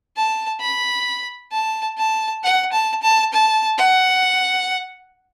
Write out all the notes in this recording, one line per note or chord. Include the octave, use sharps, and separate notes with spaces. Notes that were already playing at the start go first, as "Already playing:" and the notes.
A5
B5
A5
A5
F#5
A5
A5
A5
F#5